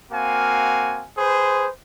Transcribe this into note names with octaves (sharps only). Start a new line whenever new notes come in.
A#3 C4 F#4 F5 G#5
G#4 B4 C5